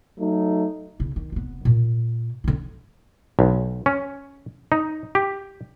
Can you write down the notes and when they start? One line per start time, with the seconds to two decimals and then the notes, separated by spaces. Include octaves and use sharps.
0.19 F#3 A3 D#4
0.99 C#3 E4
1.16 D#3
1.32 F1 B3
1.65 A#2
2.44 D3 E4
3.39 B1
3.86 C#4
4.72 D#4
5.15 G4